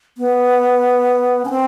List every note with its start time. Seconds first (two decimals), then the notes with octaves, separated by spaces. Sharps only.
0.18 B3
1.45 C#4
1.50 C4